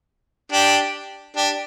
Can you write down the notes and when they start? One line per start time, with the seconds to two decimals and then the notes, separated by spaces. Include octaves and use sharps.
0.52 D4 G4
1.37 D4 G4